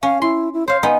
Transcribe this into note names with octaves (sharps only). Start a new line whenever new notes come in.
C#4 F5
E4 C6
E4
C5 C#5 F5
B3 D#4 G#5